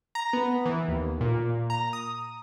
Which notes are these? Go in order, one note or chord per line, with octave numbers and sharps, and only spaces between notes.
A#5
B3
E3
D#2
A#2
A#5
D#6